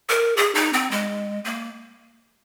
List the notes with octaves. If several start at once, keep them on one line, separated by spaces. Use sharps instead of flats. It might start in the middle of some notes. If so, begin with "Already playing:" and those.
A#4
G#4
D#4
C4
G#3
A#3